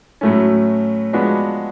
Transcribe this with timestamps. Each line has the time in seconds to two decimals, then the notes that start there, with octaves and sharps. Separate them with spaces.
0.21 A2 F#3 A3 C#4
1.13 F3 G#3 B3 D4 F#4